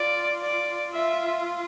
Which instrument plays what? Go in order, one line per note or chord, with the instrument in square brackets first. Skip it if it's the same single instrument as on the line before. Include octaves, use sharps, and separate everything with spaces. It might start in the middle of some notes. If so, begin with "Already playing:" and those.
Already playing: [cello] F4 [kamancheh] D5
[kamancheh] D5
[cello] F4 [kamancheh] E5